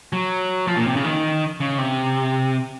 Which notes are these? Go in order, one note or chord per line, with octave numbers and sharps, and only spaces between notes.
F#3
F3
A#2
C3
C#3
D#3
C#3
C3